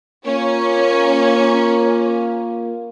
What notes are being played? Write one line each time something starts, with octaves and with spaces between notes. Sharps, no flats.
A#3 C#4 F4